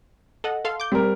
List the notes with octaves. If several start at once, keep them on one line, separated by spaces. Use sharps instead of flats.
A4 D#5 F#5
A4 F5 C6
D6 G6
G3 C4 A#4